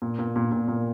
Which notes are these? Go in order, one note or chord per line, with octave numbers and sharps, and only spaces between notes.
A#2
A#2
A#2
A#2
A#2